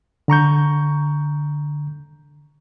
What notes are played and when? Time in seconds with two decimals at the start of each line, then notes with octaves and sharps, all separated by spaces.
0.28 D3 A#5 C#6 G6